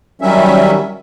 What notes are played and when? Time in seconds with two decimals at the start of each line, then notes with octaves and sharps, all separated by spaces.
0.22 D#3 F#3 G3 C#4 E5